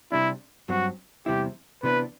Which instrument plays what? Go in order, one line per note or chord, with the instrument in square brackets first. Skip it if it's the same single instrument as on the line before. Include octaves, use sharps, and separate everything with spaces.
[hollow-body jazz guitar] C3 G3 D4 [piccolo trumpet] E4
[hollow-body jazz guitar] G2 F#3 C4 [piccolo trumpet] F#4
[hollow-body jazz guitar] E2 C3 G3 C4 E4 [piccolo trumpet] G4
[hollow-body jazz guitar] C3 E3 B3 D4 [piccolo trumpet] B4